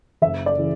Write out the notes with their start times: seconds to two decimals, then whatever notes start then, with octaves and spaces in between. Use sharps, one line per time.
0.22 F#1 E5
0.46 D5
0.58 C#3 E3